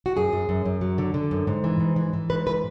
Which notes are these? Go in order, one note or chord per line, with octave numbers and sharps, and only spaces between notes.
F#4
F#2 G#4
F#2
F#2
F#2
F#3
D3
D3
F#2
G#2
E3
G#2
E3
E3
G#2 B4
E3 B4